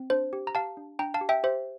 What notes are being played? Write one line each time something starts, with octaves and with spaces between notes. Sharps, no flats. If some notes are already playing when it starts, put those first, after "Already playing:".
Already playing: C4
D4 C5
G4
A#5
G4 F5 A5
D4
D4 G5 A#5
F5 A5
G4
E5 G5
G4 C5 E5